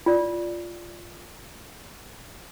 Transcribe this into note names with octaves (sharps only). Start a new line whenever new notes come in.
F4 D5